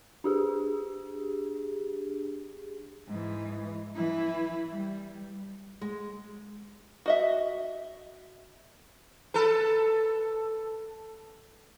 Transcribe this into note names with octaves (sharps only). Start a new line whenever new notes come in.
D4 G4 G#4
G#2 E3
E3 E4
G3
G#3
F#4 D#5 E5
A4 B4